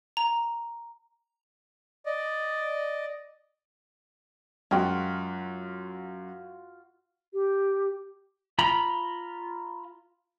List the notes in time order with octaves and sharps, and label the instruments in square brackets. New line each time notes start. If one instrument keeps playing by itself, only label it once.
[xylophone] A#5
[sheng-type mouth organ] D5 D#5
[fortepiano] F#2 [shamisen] G#3 G5 [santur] F4 F#4
[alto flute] G4
[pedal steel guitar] F4 A#5 B5